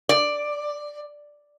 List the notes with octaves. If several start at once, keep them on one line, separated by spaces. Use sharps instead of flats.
D5